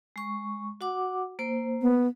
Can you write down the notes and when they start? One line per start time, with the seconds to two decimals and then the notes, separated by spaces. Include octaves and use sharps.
0.16 G#3 C#6
0.81 F#4 F#5 D6
1.39 A#3 C5
1.82 B3